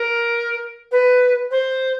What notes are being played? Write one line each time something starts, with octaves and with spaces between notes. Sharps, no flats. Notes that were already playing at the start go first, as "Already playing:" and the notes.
Already playing: A#4
B4
C5